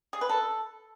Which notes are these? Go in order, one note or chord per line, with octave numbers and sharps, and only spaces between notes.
G#4
B4
A4